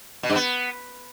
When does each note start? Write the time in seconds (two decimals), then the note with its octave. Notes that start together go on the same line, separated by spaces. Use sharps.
0.23 B2
0.30 G2
0.36 B3